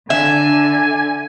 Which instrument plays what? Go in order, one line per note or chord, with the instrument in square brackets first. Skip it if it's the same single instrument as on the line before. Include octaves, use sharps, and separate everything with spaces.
[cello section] D3 [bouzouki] E5 [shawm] G#5